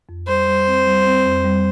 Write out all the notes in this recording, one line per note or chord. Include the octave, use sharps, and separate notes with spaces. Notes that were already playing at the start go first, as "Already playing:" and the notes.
F2
G3 C5
G3
C4
G3
C4
F2
G3